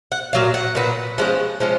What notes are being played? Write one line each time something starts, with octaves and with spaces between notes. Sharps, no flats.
F#5
A#2 F#3 F5
F#5
A#2 F#3 B3
F3 G#3 C#4 F#5
F3 G#3 C#4